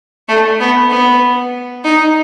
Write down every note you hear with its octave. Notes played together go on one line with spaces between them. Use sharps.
A3
B3
B3
D#4